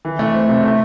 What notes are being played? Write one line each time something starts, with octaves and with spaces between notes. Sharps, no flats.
E3
A3
C4
C3
A3